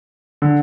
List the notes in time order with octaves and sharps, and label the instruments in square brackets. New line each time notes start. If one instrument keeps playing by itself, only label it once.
[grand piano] D3